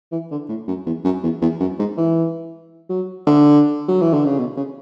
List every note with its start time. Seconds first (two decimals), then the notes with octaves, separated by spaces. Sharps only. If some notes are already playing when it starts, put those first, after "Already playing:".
0.12 E3
0.31 D3
0.49 A2
0.68 F#2
0.86 E2
1.04 F#2
1.23 E2
1.42 E2
1.60 F#2
1.79 G#2
1.97 E3
2.89 F#3
3.27 D3
3.88 F#3
4.01 E3
4.13 D3
4.25 C#3
4.38 B2
4.57 C#3